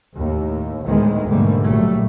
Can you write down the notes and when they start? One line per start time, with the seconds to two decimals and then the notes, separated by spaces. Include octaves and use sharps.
0.13 D#2 A2
0.84 D2 A2 D#3 G#3 B3
1.27 G#2 B2 D3 G3 A3 A#3
1.64 A#1 A#2 F#3 G3 A3